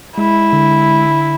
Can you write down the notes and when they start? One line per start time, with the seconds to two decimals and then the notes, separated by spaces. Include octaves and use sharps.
0.18 G#3 E4
0.53 D3